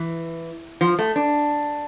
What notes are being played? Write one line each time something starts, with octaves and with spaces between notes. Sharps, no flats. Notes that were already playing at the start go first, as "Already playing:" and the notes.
Already playing: E3
F3
A3
D4